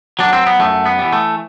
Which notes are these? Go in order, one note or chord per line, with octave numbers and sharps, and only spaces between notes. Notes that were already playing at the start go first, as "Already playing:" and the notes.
F#3 D4
C4
B3
F#2 A3
B3
E3 G3
A3